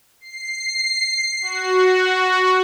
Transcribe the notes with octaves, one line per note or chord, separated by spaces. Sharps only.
C7
F#4